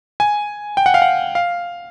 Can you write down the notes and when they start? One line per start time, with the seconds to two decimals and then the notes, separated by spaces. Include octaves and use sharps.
0.20 G#5
0.77 G5
0.86 F#5
0.94 F5
1.02 F#5
1.35 F5